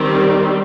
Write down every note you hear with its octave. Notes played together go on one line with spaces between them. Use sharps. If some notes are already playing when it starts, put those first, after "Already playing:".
Already playing: D#3 G3 C4